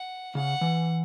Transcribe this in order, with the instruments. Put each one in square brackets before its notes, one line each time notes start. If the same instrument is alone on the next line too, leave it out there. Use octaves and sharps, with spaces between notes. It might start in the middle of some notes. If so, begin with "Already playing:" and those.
Already playing: [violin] F#5
[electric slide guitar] C#3 [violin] F#5
[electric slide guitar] E3